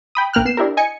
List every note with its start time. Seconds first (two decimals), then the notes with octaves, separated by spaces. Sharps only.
0.15 G5 B5 D#6
0.33 A#1 A#3 G5 F6 F#6
0.45 B3 C7 E7
0.57 D4 E4 G4 A#4
0.77 D#5 G#5 C#7